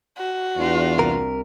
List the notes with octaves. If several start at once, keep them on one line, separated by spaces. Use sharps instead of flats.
F#4
E2 D4 F4
C2 C3 A#4